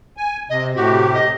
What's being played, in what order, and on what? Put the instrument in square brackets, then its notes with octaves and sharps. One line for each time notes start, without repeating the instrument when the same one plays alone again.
[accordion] G#5
[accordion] C3 [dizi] D#5
[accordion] A2 C3 G4 [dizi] F#4
[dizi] D#5